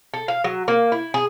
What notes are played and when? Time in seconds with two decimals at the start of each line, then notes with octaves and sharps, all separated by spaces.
0.14 A4
0.28 F5
0.44 F#3
0.68 A#3
0.92 E4
1.14 G#4